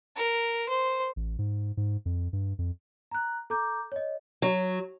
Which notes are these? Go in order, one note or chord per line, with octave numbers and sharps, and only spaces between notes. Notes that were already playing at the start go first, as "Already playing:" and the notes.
A#4
C5
A1
G#2
G#2
F2
G2
F2
A#5 F#6
A4 A#5 D6 G6
C#5 D#5
F#3